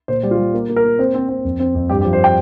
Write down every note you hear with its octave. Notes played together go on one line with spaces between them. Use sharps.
A#2 C5
G3
F4
G3
A#3
A#3
A#4
A#3
C4 C5
C4
C4
F2
C4
F2
G2 G4
G4
F3
C5
G5